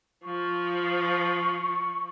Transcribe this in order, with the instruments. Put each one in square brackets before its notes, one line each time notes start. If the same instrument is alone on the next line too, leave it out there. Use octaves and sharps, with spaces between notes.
[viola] F3 [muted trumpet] C#6